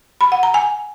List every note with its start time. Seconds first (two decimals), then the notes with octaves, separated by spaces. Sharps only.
0.21 B5
0.32 F#5
0.43 A#5
0.54 G#5